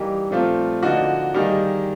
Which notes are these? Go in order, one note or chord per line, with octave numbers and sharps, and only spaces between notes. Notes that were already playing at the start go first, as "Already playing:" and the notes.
Already playing: E3 G3 A#3 D#4 G4
A#2 F3 A3 C4 F4
D3 F3 A#3 D#4 F#4
D#3 G3 A#3 D#4 G#4